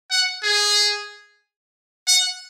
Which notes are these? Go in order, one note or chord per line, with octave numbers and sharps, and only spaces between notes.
F#5
G#4
F#5